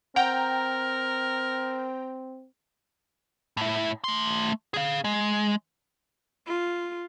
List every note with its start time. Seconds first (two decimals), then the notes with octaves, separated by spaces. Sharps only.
0.16 C4 A#4 F#5 G5 A#5
3.57 A2 E4
4.04 A3 C6
4.74 G#4 F5
5.04 G#3
6.47 F4